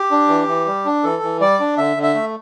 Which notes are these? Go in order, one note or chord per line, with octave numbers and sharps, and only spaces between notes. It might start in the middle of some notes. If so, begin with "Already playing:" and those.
Already playing: G4
D4
E3
E3
G3
D4
E3 A4
E3
G3 D5
D4
D3 E5
D3
E5
A3